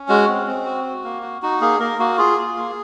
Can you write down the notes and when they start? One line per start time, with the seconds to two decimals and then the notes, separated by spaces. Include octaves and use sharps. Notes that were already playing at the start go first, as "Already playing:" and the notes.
Already playing: C#4
0.09 G#3 F#4
0.28 C4
0.47 C4
0.65 F#4
0.85 F#4
1.04 A#3
1.22 F#4
1.42 D#4 F#4
1.61 A#3 G#4
1.80 A#3 A#4
1.99 A#3 F#4
2.18 F4 G#4
2.38 F4
2.56 A#3